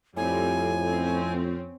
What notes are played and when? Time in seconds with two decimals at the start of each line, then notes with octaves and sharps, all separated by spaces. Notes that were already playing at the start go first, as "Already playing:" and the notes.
0.17 F2 A2 G3 C4 G#5
0.85 C4 C#4